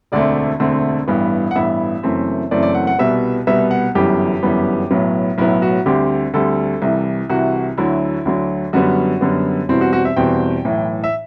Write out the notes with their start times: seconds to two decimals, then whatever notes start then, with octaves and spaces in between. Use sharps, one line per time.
0.12 E1 D2 D3 A3 C4 D5
0.60 E1 D2 D3 A3 C4
1.08 A1 G2 E3 B3
1.51 F#5
1.55 A1 G2 E3 B3 E5
2.03 F#1 F#2 E3 A3 C4
2.51 F#1 F#2 E3 A3 C4 D5
2.63 D5
2.75 F#5
2.87 F#5
2.99 C2 B2 G3 B3 E5
3.47 C2 B2 G3 B3 E5
3.71 F#5
3.95 G1 F#2 E3 G3 B3 G4
4.43 G1 F#2 E3 G3 B3
4.91 B1 A2 F#3 B3
5.38 B1 A2 F#3 B3 E4
5.62 F#4
5.86 D2 D3 G3 C4 G4
6.34 D2 D3 G3 C4 A4
6.82 C2 C3 E3
7.29 C2 C3 E3 F#4
7.78 D2 D3 F#3 E4
8.25 D2 D3 F#3
8.73 F#2 D3 G3 B3 F#4
9.21 F#2 D3 G3 B3
9.69 E2 B2 G3 C4 E4
9.81 F#4
9.93 F#4
10.05 E5
10.16 E2 B2 G3 C4 G5
10.65 B1 A2 E3
11.04 E5